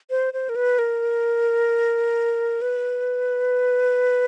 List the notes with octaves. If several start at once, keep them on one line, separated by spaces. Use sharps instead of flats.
C5
C5
A#4
B4
A#4
B4